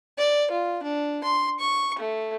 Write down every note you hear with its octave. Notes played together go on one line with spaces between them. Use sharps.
D5
F4
D4
C6
C#6
A3